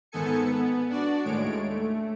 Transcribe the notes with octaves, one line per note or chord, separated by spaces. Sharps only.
G#2 D#3 B3 A4 G#5 C#7
B3
D4 F#4 D5
D#2 A2 G#3 C#5 D7
A3